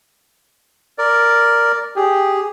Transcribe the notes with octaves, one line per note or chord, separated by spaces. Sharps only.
A#4 D5
G4 G#4